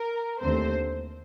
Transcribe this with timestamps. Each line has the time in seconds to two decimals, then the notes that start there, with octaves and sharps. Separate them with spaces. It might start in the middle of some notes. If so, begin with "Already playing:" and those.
Already playing: A#4
0.41 D#2 D3 A3 C4 C5